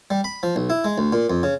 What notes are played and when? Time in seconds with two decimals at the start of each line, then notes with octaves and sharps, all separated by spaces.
0.10 G3
0.24 B5
0.43 F3
0.56 B1
0.70 E4
0.84 G#3
0.98 D2
1.13 A#2
1.30 F2
1.43 C#3